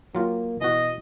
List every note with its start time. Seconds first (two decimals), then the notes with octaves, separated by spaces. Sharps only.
0.15 F#3 A#3 F4 G4
0.61 B2 E3 F#4 D#5